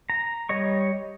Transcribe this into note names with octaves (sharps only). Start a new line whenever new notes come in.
A#5
G3 C#5 D#5 C#6